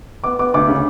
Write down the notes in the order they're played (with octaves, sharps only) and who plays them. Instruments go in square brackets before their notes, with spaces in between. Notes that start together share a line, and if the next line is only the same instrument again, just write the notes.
[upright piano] B3 D6
B3 D6
D2 D6
C#3